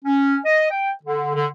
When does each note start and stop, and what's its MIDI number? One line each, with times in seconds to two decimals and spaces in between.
0.05 0.36 61
0.45 0.69 75
0.71 0.91 79
1.03 1.33 50
1.35 1.47 50